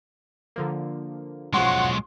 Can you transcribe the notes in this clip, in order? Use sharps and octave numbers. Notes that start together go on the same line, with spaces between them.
D3 F3 A#3
B1 F3 F#3 G#3 C#4 F#5 C6 C#6